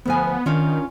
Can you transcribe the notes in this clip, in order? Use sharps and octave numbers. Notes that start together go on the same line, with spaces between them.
D2 F3 B3 G#5
D#3 C#4 D4 F4